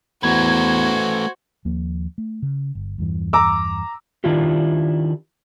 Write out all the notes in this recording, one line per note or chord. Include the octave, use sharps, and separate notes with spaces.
E2 A3 F#4 B4 C5 G#6
D#2 F3 A#3
A3
C#3
G1
E2 G2 E3
A#5 D6 E6
D#3 D4 E4 F4 G4